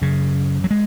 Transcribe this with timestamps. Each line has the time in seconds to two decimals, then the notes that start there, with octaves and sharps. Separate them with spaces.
0.02 F#2 C#3
0.64 F#3
0.71 G#3